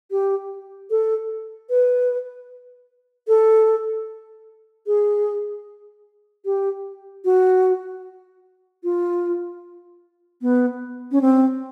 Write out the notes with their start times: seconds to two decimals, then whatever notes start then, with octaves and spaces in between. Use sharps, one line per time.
0.11 G4
0.91 A4
1.70 B4
3.28 A4
4.87 G#4
6.45 G4
7.25 F#4
8.84 F4
10.42 B3
11.11 C#4
11.21 C4